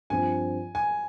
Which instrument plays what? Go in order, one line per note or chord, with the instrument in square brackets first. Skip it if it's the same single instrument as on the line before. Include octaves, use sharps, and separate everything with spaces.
[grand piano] G2 F3 C4 [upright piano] G#5
[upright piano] G#5